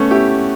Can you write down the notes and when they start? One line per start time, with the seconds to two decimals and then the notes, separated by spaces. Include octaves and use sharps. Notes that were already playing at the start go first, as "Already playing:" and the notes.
Already playing: A3 B3 C#4
0.10 E4 G4